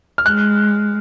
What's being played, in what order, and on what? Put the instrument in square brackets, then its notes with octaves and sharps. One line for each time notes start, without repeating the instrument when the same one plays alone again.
[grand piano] F6
[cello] G#3 [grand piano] F#6